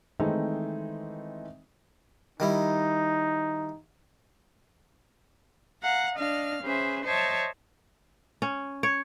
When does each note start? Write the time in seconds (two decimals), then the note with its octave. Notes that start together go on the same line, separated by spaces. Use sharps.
0.20 D#3 E3 G#3 A3 C4 D#4
2.40 D#3 G3 D#4 E4
5.82 F5 F#5 A#5
6.18 D4 D#5 F5 F6
6.64 C#4 G#4 B4 C5 E5
7.04 C5 C#5 D#5 E5 A5
8.42 C#4
8.83 C#5